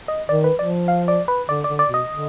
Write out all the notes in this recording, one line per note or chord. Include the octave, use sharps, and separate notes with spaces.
D#5
D#3 D5
B4
F3 D5
F5
D5
B4
D3 D5
D3 D5
D5
B2
D#5
D3